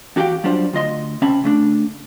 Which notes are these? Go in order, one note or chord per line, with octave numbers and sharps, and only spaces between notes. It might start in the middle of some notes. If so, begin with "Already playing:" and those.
E2 F#4 G4 F5 G5
F#3 G3 D4 F4 C5
D2 F4 D#5 C6
C3 C4 C#4 E5 A5 B5
C#3 A3 D4